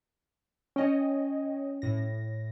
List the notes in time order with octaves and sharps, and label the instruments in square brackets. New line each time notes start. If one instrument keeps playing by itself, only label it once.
[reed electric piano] C#4 [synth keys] C#5 D#5 G5
[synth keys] A2 A#6